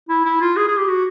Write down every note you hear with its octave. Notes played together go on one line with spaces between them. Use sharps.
E4
E4
F4
G#4
G#4
G4
F#4